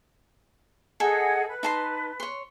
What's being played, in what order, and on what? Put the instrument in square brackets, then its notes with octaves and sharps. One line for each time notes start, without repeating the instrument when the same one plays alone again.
[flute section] G#4 D#5 F#5 [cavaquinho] A4 G#5
[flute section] B4
[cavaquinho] D#4 A5 C6
C#5 C6